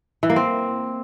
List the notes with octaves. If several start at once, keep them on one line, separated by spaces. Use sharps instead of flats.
E3
A#3
C4